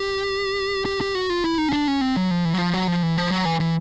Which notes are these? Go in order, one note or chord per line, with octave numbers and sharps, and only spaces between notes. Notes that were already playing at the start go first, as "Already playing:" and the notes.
Already playing: G4
G4
G4
F#4
F4
E4
D#4
C#4
D4
C#4
C4
F#3
F3
E3
F#3
F3
F#3
F3
E3
F3
F#3
E3
E3